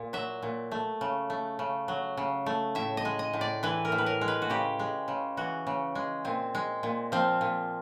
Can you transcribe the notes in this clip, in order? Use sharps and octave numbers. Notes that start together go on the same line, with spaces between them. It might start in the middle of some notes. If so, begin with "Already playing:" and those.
Already playing: A#2
F#3 E5
A#2
A3
C#3
A3
C#3
F#3
C#3
A3
A2 E5
D#5
G#3
D#5
A2
D5
E3 B4
A#4
A2
B4
A#4
G#3
B4
F#4
C#3 G4
G#3
C#3
E3 F#4
C#3
G#3
A#2 C4
G#3
A#2
F3 C4
A#2